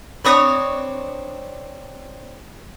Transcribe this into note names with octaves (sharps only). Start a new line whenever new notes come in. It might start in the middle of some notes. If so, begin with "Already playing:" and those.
C4 D4 C#5 B5 C#6 D#6